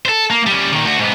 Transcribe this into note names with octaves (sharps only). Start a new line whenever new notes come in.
A4 C5
A#3
G3 C#4
A#2 D#3
D2 F#4
G#2 B3